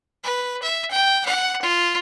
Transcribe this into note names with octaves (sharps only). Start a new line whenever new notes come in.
B4
E5
G5
F#5
F4